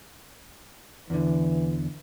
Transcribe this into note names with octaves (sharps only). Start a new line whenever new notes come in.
E2 D3 E3